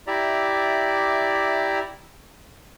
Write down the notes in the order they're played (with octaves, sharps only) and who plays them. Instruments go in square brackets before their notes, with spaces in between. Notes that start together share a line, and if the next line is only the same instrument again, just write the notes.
[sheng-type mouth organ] E4 G4 D5 E5 A#5